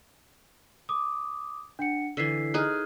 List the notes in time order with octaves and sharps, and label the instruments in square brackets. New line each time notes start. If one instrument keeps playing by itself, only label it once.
[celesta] D6 D#6
D4 F#5 C#7
[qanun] D3 E3 [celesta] E6 B6 C7
[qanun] D#4 G#4 [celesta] F6 F#6